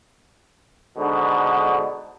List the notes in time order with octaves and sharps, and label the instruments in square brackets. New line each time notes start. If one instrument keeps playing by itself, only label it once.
[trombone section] G#2 B2 D3